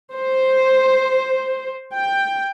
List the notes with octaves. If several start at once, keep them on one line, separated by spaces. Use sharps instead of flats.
C5
G5